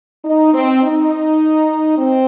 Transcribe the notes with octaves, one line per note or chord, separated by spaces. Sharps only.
D#4
C4
D#4
C4